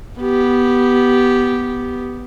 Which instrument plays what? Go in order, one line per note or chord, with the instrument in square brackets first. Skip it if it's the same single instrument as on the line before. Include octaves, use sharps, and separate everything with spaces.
[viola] B3 G4